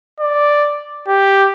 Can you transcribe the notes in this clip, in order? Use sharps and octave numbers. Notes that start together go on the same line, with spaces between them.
D5
G4